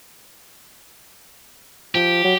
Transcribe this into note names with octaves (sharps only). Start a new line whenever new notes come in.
F3 G4
F#3